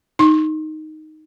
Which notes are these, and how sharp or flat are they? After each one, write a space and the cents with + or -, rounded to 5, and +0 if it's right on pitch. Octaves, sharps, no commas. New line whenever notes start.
D#4 +0 C6 +35